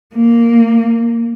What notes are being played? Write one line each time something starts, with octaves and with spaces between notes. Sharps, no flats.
A#3